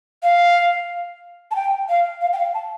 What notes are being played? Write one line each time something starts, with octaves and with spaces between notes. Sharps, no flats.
F5
A5
G5
F5
F5
G5
F5
A5